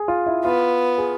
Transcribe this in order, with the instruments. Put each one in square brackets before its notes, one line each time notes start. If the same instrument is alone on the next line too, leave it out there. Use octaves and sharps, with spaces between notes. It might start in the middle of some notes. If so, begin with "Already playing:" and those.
Already playing: [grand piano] G#4
F4
E4
[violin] B3 [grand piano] F4
[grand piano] G#4